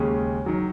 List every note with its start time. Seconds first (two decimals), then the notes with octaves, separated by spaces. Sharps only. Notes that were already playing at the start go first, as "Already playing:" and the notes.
Already playing: D#2 C#3 G#3 C#4
0.46 D#3 F#3